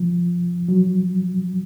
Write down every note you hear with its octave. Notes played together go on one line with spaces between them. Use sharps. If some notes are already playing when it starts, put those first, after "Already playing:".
Already playing: F3
F#3